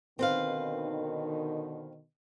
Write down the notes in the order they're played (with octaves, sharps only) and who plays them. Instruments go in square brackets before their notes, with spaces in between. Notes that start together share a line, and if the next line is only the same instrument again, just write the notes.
[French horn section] B2 D3 D#3 [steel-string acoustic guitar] C4 B4 F5